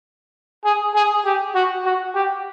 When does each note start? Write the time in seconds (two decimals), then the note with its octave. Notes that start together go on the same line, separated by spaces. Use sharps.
0.64 G#4
0.94 G#4
1.25 G4
1.54 F#4
1.85 F#4
2.14 G4